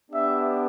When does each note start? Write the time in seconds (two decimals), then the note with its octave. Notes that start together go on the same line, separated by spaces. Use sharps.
0.11 B3 D4 G4 E5